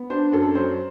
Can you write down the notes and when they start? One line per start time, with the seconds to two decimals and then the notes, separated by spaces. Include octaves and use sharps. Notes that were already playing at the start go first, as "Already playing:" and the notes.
Already playing: B3
0.10 D4 C5
0.32 F#2 A4
0.55 F#3 C5